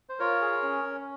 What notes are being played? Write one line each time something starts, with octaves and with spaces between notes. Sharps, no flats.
C5
F4 A#4 C#5
G#4
C#4
C#4